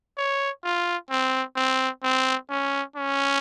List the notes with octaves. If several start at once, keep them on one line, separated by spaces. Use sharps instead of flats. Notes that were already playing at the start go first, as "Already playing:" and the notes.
C#5
F4
C4
C4
C4
C#4
C#4